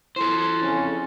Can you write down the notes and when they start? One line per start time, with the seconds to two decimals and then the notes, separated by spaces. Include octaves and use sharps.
0.16 E4 A4 C5
0.62 F2 C#3 C#4